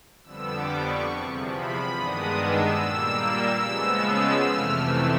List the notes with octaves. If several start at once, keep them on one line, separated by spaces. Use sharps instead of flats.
F2 D3 G3 B3 E6
D6
C#6
E2 C3 F3
B5
G2 D#3 G#3 B3 D4 D#6
E6
A#2 G3 A#3
C#3 F3 G#3 B3
F2 C3 E3 A3 F6
E6